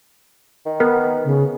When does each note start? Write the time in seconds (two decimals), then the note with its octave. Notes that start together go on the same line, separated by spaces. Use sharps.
0.66 D#3
0.80 B3 A#4
1.24 C#3